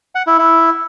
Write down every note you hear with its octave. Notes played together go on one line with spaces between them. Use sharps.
F#5
E4
E4